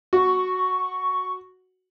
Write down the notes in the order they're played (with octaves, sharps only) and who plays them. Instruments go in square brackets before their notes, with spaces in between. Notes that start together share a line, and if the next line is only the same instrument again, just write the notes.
[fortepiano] F#4 [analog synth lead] C#6